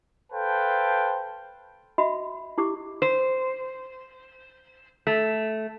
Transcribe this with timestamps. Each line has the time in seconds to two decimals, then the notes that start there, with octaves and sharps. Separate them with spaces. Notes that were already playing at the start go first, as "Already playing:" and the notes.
0.33 A4 B4 C5 F5 G5 A5
1.98 F#4 D#5 E5 B5
2.58 E4 G4 D6
3.02 C5
5.07 A3